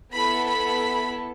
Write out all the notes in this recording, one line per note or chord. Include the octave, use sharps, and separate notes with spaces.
B3 E4 A4 B5
B5